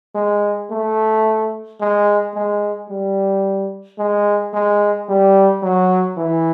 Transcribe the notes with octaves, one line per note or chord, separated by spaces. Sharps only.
G#3
A3
G#3
G#3
G3
G#3
G#3
G3
F#3
E3